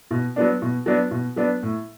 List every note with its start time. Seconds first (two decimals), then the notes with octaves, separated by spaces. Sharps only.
0.11 B2
0.36 F#3 B3 D4
0.62 B2
0.86 F#3 B3 D4
1.11 B2
1.36 F#3 B3 D4
1.63 A2